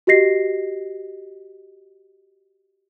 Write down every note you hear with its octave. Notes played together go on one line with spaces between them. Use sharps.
F#4 G4 D#5 A#6 C7